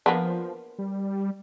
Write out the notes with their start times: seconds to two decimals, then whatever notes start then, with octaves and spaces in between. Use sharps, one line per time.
0.06 F3 A#3 B3 D4
0.79 G3